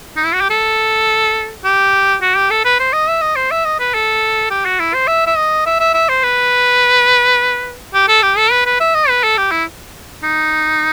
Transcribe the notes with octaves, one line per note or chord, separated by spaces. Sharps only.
D#4
E4
F#4
G4
A4
G4
F#4
G4
A4
B4
C5
D#5
E5
D#5
C5
E5
D#5
B4
A4
G4
F#4
E4
C5
E5
E5
D#5
E5
E5
E5
C5
B4
G4
A4
G4
A4
B4
B4
E5
D#5
B4
A4
G4
E4
D#4